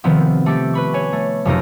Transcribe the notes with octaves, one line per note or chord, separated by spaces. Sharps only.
C3 D#3 F3 B3 C4
A3 G4 A4
B4 B5 C#6
C#5 G#5
A3
F#1 F2 C3 D#4 A#4